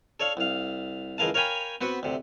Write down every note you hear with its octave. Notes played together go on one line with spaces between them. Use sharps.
A4 C#5 D5 F5
C2 F5
C#2 E3 G#4 A#4 F5 A5
A#4 C#5 F5 G5 G#5 B5
B3 C4 F#4 B4 F#5
D2 C3